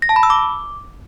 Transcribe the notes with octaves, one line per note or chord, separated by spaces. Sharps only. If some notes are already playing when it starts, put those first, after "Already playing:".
A#6
A5
B5
E6
D6